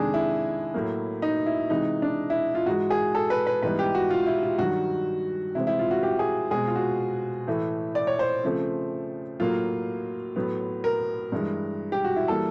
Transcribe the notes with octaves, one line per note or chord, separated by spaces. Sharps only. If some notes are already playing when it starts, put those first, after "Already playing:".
Already playing: F2 C3 D#3 G#3 D4 G#4
E4
A2 F#3 A#3
D#4
E4
C3 E3 G#3 D#4
D4
E4
F4
G#2 E3 G#3 F#4
G#4
A4
B4
B4
G#2 E3 G3 B3 B4
G4
F#4
F4
E4
F4
G2 D#3 F#3 F#4
C3 E3 G#3 C4 E4
E4
F4
F#4
G4
G#4
B2 G#3 C4 G#4
F4
F#4
A2 E3 A3
D5
C#5
C5
C#3 F3 A3 C4
A2 F#3 A#3 F4
A2 F#3 B3
A#4
G2 E3 G#3
G4
F#4
E4
E3 G3 A#3 A4